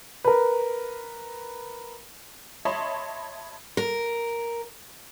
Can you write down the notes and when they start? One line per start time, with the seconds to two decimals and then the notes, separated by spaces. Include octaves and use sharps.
0.24 A#4 B4
2.65 C#5 D#5 E5 A5 B5 C6
3.77 A#4